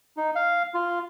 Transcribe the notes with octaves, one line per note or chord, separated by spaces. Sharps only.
D#4
F5
F4